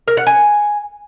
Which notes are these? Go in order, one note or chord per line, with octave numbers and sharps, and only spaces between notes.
A#4
F#5
G#5